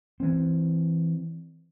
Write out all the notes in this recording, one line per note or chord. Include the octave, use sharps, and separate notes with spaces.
E3 C4